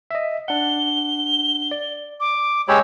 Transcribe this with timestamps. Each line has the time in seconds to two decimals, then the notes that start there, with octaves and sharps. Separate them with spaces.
0.11 D#5 E5
0.48 D4 F#5 G7
1.71 D5
2.20 D6
2.68 G#3 G4 C#5 G5 A5 B5 E6